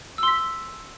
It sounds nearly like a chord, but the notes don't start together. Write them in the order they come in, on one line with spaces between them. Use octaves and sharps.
E6 C6 B6